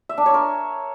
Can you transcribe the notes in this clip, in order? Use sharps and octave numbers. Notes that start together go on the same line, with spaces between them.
E5
D4
C#5
A#4